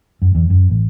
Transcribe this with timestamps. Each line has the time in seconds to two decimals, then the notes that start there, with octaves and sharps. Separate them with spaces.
0.22 F#2
0.35 E2
0.50 F#2
0.70 A1